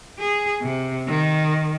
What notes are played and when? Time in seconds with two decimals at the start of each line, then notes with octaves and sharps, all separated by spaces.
0.20 G#4
0.62 C3
1.07 D#3